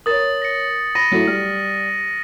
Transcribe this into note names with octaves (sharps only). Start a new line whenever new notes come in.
A#4 C#5 D#6 A6
A#6 C#7
B5 A#6 D#7
F#3 A3 E4
G3 F6